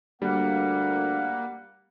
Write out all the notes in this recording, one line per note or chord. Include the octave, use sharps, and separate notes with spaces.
D2 G3 A#3 F#5